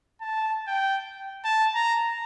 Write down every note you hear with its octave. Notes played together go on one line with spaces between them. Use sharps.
A5
G5
A5
A#5